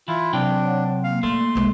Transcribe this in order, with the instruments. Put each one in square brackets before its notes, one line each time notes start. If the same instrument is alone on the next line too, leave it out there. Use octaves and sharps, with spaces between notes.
[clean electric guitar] E3 [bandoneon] E4 F4
[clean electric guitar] C3 F#3 G5 [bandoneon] D4
[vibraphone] C#5 F#5
[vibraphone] A#3 [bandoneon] F5
[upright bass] G3 [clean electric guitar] A3 [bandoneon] C6
[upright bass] B1 G#3